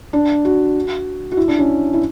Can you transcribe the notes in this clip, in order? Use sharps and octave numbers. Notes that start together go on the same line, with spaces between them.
D4
F#4
F#4
E4
D4
C#4
E4